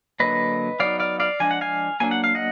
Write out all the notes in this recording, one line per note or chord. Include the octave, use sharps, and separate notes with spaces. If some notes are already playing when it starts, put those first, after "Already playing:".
D3 F#3 A#3 B4 D#5
F#3 B3 D#4 D5 F5
D5 F5
D5 F5
F3 G#3 D4 G#5
F#5
F5 G#5
F#3 A#3 D4 G#5
F#5
F5
D#5 F#5